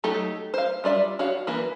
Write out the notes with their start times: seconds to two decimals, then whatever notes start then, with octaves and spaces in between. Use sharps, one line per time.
0.04 F#3 A3 D#4 G4 A4
0.54 C5 F5
0.84 G3 F4 D5 E5
1.19 F#4 C#5 F5
1.47 E3 A#3 B4